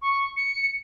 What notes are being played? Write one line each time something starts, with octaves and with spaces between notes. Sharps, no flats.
C#6
C#7